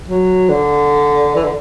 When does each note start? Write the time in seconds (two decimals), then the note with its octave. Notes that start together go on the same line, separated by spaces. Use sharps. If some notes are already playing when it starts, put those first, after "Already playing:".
0.08 F#3
0.50 D3
1.36 E3
1.44 D3